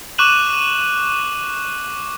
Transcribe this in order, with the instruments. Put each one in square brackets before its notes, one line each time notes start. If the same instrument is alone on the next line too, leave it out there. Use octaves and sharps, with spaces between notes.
[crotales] C#6 D6 F#6 D#7 E7 F#7